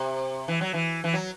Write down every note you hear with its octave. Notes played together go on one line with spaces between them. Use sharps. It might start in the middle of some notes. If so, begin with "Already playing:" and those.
Already playing: C3
E3
F#3
E3
E3
F#3